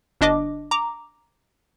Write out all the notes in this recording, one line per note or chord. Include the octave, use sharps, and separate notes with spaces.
G1 D4 D#5 D6
A#5 D6